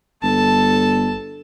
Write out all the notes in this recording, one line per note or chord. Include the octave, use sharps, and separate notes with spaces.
G1 A4 A5